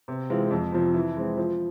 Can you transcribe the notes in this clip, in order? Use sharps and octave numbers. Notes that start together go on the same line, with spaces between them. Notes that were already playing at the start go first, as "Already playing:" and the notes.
C3
E3 G#3 C4 F4
F2
C3 F3
E3
G#3 C4
F3